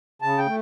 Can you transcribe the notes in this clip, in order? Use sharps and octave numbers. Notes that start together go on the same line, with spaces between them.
C#3 A5
G5
A3